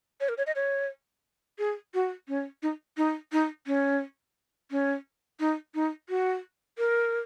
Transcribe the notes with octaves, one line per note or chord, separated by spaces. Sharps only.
C#5
A#4
C#5
D#5
C#5
G#4
F#4
C#4
D#4
D#4
D#4
C#4
C#4
D#4
D#4
F#4
A#4